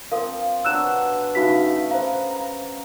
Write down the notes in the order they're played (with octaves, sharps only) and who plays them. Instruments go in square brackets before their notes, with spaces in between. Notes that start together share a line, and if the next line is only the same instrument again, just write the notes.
[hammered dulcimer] F3 C4 [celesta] A#4 F5
[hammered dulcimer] B2 F#3 D4 [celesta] E6 F#6 E7
[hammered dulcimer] C#3 A3 F5 [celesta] D#4 F#4 B6
[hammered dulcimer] B4 A#5 [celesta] C5 F5
[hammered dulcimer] A#5